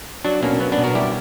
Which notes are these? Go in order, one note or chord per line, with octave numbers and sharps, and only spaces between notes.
F#3 D4 F#4
B2 A#3 C#4
F#3 B3
B3 D4
B2
F#4 A#4
G3 E4 G4